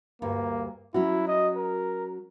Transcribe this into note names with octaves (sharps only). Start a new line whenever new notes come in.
D2 G2 A#3
F#3 C#4 E4 F#4
D#5
A#4